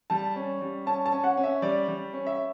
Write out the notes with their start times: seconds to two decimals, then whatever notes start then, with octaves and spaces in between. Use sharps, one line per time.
0.10 G3 A5
0.36 C#4
0.61 G3
0.86 C#4 A5
1.06 A5
1.12 C#4
1.24 F#5
1.37 C#4
1.43 E5
1.62 G3 D5
1.88 G3
2.13 C#4
2.27 E5